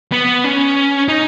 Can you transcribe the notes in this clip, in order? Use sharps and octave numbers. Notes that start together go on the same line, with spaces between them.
B3
C#4
D#4